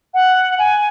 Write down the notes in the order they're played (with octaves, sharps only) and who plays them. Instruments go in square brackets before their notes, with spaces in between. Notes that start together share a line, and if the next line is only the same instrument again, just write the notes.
[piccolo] F#5
G#5